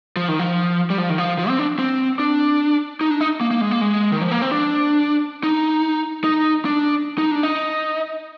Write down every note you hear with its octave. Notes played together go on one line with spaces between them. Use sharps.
F3
D#3
F3
G3
F3
D#3
F3
F3
C4
D4
C4
D4
D#4
D4
D#4
A#3
A#3
G#3
A#3
G#3
D#3
F3
A#3
C4
D4
D#4
D#4
D4
D#4
D4
D#4